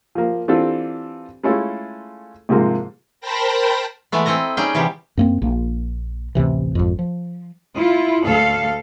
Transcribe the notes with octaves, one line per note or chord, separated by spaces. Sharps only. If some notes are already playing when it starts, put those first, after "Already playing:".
F3 A#3
E3 C4 D4 F4 G4 A4
G#3 A3 C#4 E4 F4 A4
C2 G#2 C3 F3 G#3 A#3
A#4 C5 G5 A5 B5 A#6
E3 G#3 A3 B3
C4 E4 A4 D#5 A#5
G3 C#4 D#4 G#4 G5
C3 E3 B3 G4
F#2 A#3 C4
A#1 A#3
A1 D2 C3 E3
G#1 F2
F3
E4 F4
D2 A4 F5